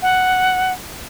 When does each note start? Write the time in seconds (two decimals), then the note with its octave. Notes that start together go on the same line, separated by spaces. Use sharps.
0.02 F#5